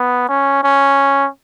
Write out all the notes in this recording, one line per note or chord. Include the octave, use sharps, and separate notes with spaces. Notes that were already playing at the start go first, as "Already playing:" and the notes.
Already playing: B3
C#4
C#4